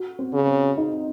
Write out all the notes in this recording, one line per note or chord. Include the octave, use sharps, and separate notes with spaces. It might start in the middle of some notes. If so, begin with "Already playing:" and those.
Already playing: F#4
C4
C#3
C4
D#4